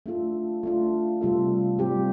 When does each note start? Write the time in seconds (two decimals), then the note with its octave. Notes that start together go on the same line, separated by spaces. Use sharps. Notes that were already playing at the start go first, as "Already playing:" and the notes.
0.06 A3 D4 F4 A4
0.63 A3 D4 F4
1.21 C3 G3 F4 A4
1.79 G3 C4 G4